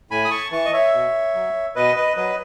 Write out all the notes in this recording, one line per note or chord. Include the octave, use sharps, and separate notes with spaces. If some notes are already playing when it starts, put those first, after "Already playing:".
A2 G#5 B5
D#6
A5 C#6
E3 A5 C#6
D#5
C#5 E5
B2
F#3
B2 B4 D#5
B4 D#5
F#3 B4 D#5